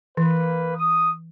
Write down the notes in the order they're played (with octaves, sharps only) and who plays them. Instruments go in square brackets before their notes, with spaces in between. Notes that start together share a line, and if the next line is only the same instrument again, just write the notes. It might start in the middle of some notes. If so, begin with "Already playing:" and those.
[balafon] E3 [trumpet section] A#3 B4
[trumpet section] D#6